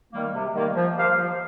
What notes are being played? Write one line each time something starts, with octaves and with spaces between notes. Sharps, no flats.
D#3 G3 A#3
C3
D#3 G3 A#3
F3
A#3 G4 C5 F5
F3